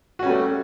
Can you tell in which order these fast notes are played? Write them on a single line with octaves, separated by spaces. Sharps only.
F#4 C#4 G3 A3